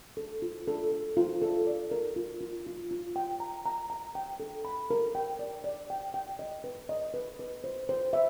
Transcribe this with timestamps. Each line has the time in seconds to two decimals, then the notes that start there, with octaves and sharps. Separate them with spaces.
0.17 A4
0.42 F4
0.68 A4
0.92 A4
1.17 F4
1.42 A4
1.67 D5
1.91 A#4
2.16 F4
2.41 F4
2.67 F4
2.91 F4
3.16 G5
3.40 A#5
3.66 A#5
3.90 A#5
4.15 G5
4.40 A4
4.65 B5
4.91 A#4
5.15 G5
5.39 D5
5.64 D5
5.90 G5
6.14 G5
6.39 D#5
6.64 B4
6.89 D#5
7.14 B4
7.39 B4
7.64 C5
7.89 C5
8.13 E5